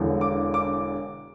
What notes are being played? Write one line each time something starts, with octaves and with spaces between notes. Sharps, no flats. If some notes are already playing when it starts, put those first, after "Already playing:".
Already playing: E1 E2 D3
D6
D6